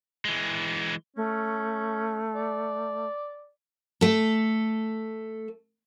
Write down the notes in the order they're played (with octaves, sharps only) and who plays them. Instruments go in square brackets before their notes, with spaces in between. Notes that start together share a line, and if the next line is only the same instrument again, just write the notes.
[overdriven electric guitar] E3 G#3
[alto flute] A3 [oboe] C#4
[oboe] D5
[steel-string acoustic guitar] A3 A4